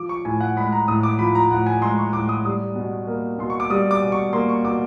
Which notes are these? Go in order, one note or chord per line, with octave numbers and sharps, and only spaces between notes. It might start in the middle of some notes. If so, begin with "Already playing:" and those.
Already playing: F3 D6
C#6
A2 G#5
F#5
G#3 B5
A#5
A2 D#6
D6
F3 B5
A#5
A2 F#5
G#5
G#3 C6
C#6
A2 D6
D#6
G3 D#6
B2
A#3
B2 C6
C#6
D6
G3 D#6
D6
B2
C#6
A#3 C6
C#6
B2 D6